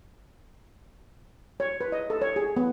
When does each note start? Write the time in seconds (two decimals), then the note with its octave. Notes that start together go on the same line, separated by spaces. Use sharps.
1.60 C#5
1.81 B4
1.92 D#5
2.10 A4
2.22 C#5
2.36 G#4
2.57 B3